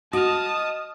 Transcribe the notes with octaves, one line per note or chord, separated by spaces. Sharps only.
F#4 D#5 A5 D#6 F6